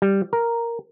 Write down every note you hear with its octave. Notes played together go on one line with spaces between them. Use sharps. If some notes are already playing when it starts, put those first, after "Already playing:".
G3
A#4